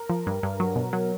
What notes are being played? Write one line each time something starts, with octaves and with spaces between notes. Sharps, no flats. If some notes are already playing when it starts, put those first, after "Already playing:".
Already playing: A#4
F3
G2
G2
F#3
B2
F#3